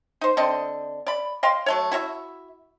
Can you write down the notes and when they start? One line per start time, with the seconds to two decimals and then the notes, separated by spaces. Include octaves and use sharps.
0.21 D#4 C5
0.37 D3 C4 D#5
1.06 D5 B5
1.43 D#5 F5 G5 C6
1.66 F#3 A3 C#5
1.91 E4 F#4 C#5 E5